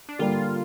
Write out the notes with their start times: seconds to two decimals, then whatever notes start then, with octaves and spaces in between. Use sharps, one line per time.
0.09 D4
0.19 D3 G3 A#3 F4